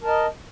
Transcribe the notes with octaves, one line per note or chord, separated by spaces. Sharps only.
A#4 D#5 A5